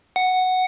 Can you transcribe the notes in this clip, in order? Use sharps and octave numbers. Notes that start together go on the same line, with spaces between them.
F#5